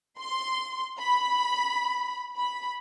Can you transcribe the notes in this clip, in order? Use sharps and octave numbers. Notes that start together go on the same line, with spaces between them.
C6
B5
B5